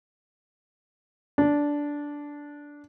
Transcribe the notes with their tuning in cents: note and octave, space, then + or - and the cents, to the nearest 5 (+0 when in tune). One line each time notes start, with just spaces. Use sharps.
D4 -10